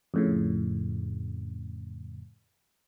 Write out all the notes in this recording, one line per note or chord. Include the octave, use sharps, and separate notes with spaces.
F2 A2 C#3